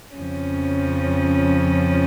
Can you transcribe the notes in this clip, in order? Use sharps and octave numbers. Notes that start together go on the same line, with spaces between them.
F2 C#3 F3 C#4